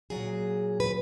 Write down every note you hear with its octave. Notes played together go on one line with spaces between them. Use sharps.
A#2 F#3 G#4
B4